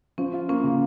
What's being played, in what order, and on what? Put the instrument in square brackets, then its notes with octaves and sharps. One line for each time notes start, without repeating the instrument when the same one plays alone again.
[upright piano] F3 [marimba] C#4
[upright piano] F4
[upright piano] A#3 [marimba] C#4
[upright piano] C#3